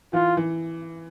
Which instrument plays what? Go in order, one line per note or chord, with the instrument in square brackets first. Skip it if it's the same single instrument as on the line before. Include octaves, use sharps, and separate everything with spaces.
[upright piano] E3 [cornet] F4
[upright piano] E3